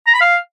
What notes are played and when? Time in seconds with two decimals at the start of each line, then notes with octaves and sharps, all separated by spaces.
0.07 A#5
0.14 B5
0.21 F5